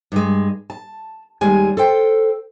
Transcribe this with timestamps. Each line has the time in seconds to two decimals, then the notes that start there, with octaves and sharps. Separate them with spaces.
0.12 G2 G#3
0.70 A5
1.41 D#2 G3 G#3 G#5
1.77 A4 C5 G5